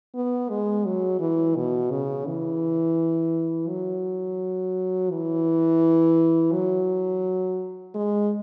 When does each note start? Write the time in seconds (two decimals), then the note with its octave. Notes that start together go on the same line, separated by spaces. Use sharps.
0.14 B3
0.49 G#3
0.85 F#3
1.20 E3
1.56 B2
1.91 C#3
2.27 E3
3.68 F#3
5.11 E3
6.53 F#3
7.95 G#3